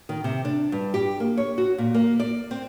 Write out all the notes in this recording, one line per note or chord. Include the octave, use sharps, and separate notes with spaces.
D#3
C3
D4
G2
G4
A#3
C#5
F#4
A#2
A#3
D5
C4